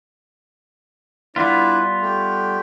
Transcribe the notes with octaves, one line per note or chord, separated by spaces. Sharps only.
G3 B3 D4 E4 F4 B4
A3 G4